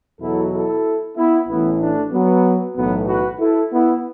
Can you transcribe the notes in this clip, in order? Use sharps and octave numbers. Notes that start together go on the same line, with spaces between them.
E2 B2 F#3 E4 A4
E4 A4
B3 E4
A1 A2 E3 B3 E4
A3 D4
F#3 B3
B1 A2 E3 F#3 B3
F#4 B4
E4 A4
B3 E4